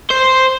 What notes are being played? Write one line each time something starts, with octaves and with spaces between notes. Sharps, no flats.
C5